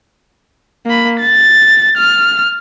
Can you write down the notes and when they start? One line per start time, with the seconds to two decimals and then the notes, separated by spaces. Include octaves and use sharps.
0.86 A#3 B5
1.20 A6
1.97 F6